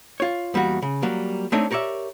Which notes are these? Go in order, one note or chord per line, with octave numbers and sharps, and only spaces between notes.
F4 C#5
E2 G3 A#3 F#4
C#3
F#3 G3 A#3
A3 C4 D4 D#4 C#5 E5
G4 A#4 C#5 D5 E5